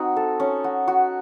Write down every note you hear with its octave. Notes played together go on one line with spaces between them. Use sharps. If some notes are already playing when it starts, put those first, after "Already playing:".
Already playing: C4 D#4 F#4
A4
C#4
F#4
F#4